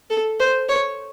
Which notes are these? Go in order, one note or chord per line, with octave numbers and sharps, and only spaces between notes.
A4
C5
C#5